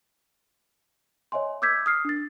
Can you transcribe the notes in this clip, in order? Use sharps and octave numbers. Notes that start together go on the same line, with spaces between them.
C#5 D#5 E5 G#5 C6
D6 E6 G6 G#6 B6
D#6 F6 C7
D4 A6